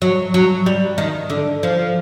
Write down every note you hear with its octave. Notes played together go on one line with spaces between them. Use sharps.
F#3
F#3
G3
D#3
D3
F3